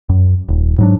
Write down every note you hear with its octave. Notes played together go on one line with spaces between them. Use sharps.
F#2
D#1
G#2 F#3 D4